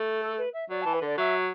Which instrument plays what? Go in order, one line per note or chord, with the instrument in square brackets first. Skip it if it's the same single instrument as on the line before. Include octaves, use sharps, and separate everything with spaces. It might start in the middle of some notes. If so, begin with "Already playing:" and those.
Already playing: [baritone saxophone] A3
[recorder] A4
B4
E5
[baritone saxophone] F#3 [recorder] D5
[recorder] A5
[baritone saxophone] E3
[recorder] B4
[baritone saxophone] D3 [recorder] D5
[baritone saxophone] F#3 [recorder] E5